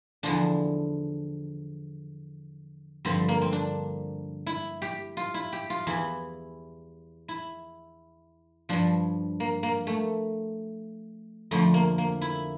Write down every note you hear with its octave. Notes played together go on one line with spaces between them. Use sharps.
E2 D3 F3 D4
G2 D3 F3 C4
A#3
C4
D4
E4
G4
F4
E4
G4
F4
E2 E3 E4
E4
G2 F3 D4
A#3
A#3
A3
F2 D3 F3 A3
A#3
A#3
E4